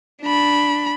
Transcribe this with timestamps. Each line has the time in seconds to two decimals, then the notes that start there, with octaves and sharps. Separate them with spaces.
0.22 D4 B5